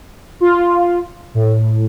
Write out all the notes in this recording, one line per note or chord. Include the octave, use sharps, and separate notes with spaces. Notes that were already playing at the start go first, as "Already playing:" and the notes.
F4
A2